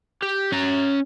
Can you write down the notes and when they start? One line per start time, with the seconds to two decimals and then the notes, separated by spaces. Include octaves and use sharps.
0.23 G4
0.52 C#4 A#5